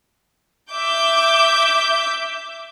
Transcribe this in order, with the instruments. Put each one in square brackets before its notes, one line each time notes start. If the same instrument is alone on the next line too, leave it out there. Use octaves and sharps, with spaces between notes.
[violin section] E5 D6 G6